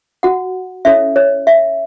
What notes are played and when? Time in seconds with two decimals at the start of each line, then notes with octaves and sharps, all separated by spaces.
0.23 F#4 F#5
0.85 C#4 E4 A4 C#5 E5
1.16 C#5
1.47 E5